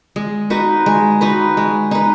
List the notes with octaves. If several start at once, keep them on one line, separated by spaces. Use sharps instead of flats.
G#3
D#4 F#4 B4
G#3
D#4 F#4 B4
G#3
D#4 B4